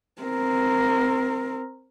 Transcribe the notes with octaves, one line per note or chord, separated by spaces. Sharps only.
C4 A#4